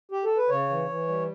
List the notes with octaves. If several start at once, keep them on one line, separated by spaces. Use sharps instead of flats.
G4
A4
B4
C#3 C#5
E3
E3
G3